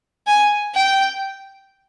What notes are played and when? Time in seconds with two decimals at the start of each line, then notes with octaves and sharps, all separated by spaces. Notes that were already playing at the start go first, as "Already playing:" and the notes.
0.27 G#5
0.74 G5